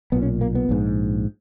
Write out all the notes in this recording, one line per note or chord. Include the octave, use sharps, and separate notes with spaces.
B1 A#2 B3
C#4
A#3
B3
A#1 G#2